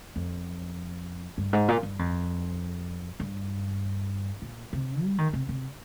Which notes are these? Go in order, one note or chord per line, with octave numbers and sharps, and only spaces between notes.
F2
G2
G#2
A#2
G2
F2
G2
A#2
C3
G3
D#3
C3
C3